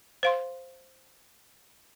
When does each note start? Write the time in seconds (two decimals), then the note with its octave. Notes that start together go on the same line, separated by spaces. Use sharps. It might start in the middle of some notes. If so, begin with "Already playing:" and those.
0.23 C5 F5 C6